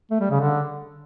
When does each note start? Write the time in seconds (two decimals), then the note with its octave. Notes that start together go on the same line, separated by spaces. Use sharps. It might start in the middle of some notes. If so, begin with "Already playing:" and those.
0.11 A3
0.21 G3
0.30 C#3
0.40 D3